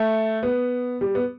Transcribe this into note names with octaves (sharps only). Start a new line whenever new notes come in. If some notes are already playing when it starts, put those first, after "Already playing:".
Already playing: A3
B3
G3
B3